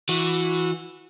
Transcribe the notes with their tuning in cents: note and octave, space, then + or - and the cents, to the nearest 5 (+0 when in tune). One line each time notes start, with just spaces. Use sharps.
E3 +0 F#4 -20